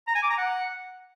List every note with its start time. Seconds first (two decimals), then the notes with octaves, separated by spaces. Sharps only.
0.07 A#5
0.15 G#5
0.23 D6
0.30 A#5
0.38 F#5